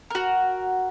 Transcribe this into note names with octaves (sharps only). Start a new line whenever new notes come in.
F#4 A#4